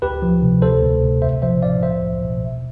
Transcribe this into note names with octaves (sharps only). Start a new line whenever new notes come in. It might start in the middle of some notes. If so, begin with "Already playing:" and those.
D2 G4 B4
F3
C3
D2 A4 C5
D2
C3
A1 C5 E5
F3 C5 E5
A2 D5 F5
C2 C5 E5
C2
B2
G1